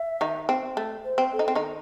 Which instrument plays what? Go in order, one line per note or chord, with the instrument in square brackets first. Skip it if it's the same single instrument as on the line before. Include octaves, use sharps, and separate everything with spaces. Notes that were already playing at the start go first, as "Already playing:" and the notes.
Already playing: [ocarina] E5
[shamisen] D#3 D#4
C4
A3
[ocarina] C5
[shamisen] C4
[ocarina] A4
[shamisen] D#4
C4
D#3 D#4